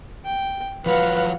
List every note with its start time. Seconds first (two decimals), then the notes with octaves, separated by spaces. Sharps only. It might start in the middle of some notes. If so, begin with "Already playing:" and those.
0.25 G5
0.86 F3 F#3 F#4 B4 F5 F#5